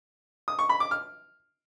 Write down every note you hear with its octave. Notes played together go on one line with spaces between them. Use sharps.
D#6
C#6
B5
D6
F6